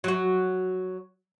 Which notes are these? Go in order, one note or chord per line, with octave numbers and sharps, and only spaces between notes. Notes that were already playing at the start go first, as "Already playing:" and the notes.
F#3 F#4